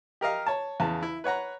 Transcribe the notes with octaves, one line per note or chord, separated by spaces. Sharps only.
G4 A#4 D#5 F5
C#5 A5
E2 C#3 A5
E4
B4 C#5 F#5 A#5